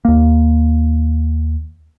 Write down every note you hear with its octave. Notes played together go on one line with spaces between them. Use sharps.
D#2 A#3